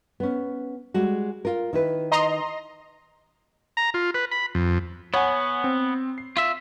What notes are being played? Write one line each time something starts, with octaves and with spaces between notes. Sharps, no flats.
B3 C#4
G3 G#3 F#4
F4 A#4
D#3 E4 B4
D#5 A#5 C6
A#5
F4
B4
B5
F2
B3 C#5 F#5 G#5
C4
C7
F4 E5